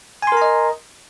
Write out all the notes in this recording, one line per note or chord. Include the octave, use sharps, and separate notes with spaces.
A#4 D#5 G#5 A#5 C6